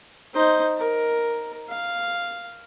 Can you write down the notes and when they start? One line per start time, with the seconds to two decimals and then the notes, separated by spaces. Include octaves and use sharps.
0.34 D#4 C5
0.78 A#4
1.69 F5